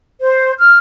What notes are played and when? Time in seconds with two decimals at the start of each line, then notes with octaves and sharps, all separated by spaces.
0.21 C5
0.59 F6